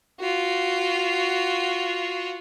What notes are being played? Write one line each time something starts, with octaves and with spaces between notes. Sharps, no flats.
F4 F#4